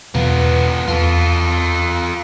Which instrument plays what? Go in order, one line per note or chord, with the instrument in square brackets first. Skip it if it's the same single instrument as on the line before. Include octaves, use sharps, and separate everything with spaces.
[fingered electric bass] E2 B2 E3 [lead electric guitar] B3 F4
[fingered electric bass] E2 [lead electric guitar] F4 A4